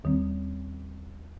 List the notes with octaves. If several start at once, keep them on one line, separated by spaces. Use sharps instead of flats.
D#2 D#3 G3 C4